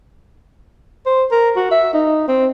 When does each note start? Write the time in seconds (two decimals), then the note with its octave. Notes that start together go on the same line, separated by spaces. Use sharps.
1.06 C5
1.31 A#4
1.56 F#4
1.71 E5
1.93 D#4
2.28 C4